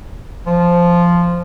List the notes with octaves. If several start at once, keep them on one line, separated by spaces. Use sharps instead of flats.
F3